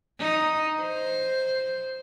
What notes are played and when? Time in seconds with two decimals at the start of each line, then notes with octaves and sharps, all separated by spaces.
0.20 D#4
0.82 C5